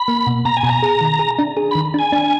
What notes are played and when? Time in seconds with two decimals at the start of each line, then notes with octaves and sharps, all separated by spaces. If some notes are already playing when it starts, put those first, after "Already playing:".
Already playing: B5
0.08 A#3
0.27 B2
0.45 B2 A#5
0.57 G#5
0.63 B2
0.70 A#5
0.83 G#4
1.01 D#3
1.19 G#4
1.39 D4
1.57 G#4
1.71 D#3 B5
1.94 D4 G#5
2.12 D4